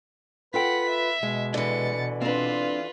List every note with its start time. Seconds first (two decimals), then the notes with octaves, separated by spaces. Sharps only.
0.54 F4 A4 B4 F#5 G5 B6
0.91 E5
1.23 B2 G#3
1.54 D3 E3 A6 C#7
2.21 C4 D4 F4 B4